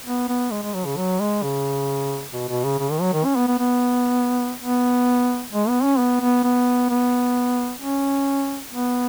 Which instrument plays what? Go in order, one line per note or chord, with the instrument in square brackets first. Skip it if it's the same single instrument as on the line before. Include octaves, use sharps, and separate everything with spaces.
[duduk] B3
B3
G#3
G#3
F#3
C#3
F#3
G#3
C#3
B2
B2
C#3
C#3
D#3
F#3
D#3
C#4
B3
B3
B3
B3
G#3
B3
C#4
B3
B3
B3
B3
C#4
B3